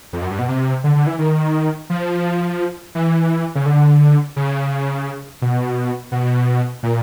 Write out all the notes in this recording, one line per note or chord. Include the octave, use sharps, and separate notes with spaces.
F2
F#2
G2
B2
C3
D3
D3
E3
D#3
F3
E3
C#3
D3
C#3
B2
B2
A#2